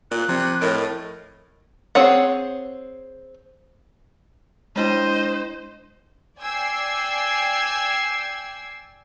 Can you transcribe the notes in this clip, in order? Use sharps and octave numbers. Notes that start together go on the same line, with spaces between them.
A#2 F#6
C3 F3 C4
A2 A#4 D#5
C4 G#4 C#5 F#5
G#3 D4 E4 C5 D#5
D5 G5 G#5 E6 G#6 C7